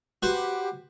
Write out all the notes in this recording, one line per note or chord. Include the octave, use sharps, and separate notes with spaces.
F#4 G4 B4 C5